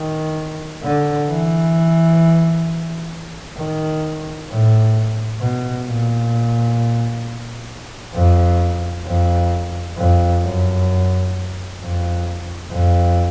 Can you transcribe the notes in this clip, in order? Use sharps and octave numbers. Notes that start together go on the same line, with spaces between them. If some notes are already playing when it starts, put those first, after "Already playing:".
Already playing: D#3
D3
E3
D#3
A2
B2
A#2
F2
F2
F2
F#2
F2
F2